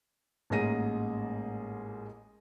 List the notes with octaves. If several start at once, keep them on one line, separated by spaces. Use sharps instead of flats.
A1 G#2 A#3 G#4 A#6 D#7